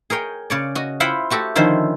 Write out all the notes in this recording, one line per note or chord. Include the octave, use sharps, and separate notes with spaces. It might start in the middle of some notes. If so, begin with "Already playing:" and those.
G#4 A#4 C#5 G5
C#3 C#5 D5
F#4 D#5
E4 F4 C5 F#5 G5 B5
A3 F#4 G4 A4
D3 D#3 F3 C#4 E4 C5